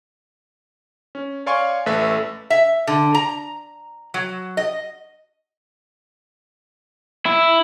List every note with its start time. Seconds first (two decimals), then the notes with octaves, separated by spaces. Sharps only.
1.15 C#4
1.46 C#5 D5 F5 G#5 C6 C#6
1.86 A1 A3 A4 B4 E5 B6
2.50 E5
2.87 D3
3.14 A#5
4.14 F#3
4.57 D#5
7.26 E4